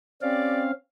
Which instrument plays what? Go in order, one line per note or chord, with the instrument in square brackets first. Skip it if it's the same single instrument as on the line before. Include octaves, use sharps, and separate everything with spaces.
[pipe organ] C4 C#4 F5 [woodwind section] G4 D5